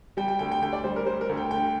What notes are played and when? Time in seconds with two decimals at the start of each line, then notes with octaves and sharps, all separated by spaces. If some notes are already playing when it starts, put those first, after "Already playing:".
0.17 G3 G5
0.28 G5
0.39 D2 G5
0.52 G5
0.62 D2 G5
0.73 D5
0.84 G3 C5
0.96 A#4
1.06 G3 C5
1.21 A#4
1.29 D2
1.37 G5
1.51 D3 G5